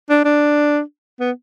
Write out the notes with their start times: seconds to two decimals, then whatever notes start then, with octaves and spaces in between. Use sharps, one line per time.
0.10 D4
0.25 D4
1.20 B3